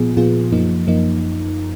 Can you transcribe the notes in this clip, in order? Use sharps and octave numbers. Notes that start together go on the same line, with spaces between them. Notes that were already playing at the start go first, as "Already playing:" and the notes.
Already playing: A#2 F3 B3 F4 G#4
A#2 F3 B3 F4 G#4
F#2 F3 A#3 D#4
F#2 F3 A#3 D#4